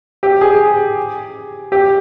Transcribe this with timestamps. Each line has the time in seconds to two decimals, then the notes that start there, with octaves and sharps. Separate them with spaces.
0.23 G4
0.41 G#4
1.72 G4